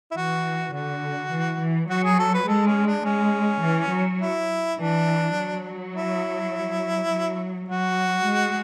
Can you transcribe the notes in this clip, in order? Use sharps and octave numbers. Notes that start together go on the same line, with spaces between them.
E4
E3 F#4
D3 F#4
E3
E3
F#3 F#4
G#4
A4
B4
G#3 A4
C#4
D4
G#3 C#4
E3
F#3
E4
E3 D4
F#3
E4
F#3
F#3 F#4
G#3